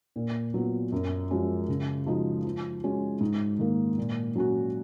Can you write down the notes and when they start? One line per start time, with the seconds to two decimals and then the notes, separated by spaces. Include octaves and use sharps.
0.16 A#2
0.54 F#3 B3 F4
0.92 F#2
1.31 F3 G#3 C#4 F#4
1.68 C#3
2.06 F3 G#3 D#4 F#4
2.44 F3
2.83 G#3 C#4 F#4
3.21 G#2
3.59 D#3 A#3
3.98 A#2
4.35 F#3 C#4 F#4